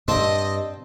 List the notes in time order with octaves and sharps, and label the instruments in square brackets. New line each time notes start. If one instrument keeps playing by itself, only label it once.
[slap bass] G2 [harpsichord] C4 A5 [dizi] D#5